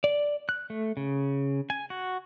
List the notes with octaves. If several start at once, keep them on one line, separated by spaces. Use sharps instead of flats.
D5
F#6
A3
C#3
G#5
F#4